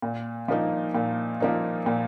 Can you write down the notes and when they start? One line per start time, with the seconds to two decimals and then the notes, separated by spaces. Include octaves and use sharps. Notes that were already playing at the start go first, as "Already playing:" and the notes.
0.02 A#2
0.48 F3 A#3 D#4
0.94 A#2
1.40 F3 A#3 D#4
1.86 A#2